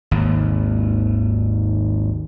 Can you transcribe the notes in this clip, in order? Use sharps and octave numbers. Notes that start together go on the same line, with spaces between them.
G#1 D#2